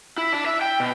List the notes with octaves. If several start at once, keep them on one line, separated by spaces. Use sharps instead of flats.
E4
D4
E5
G5
B2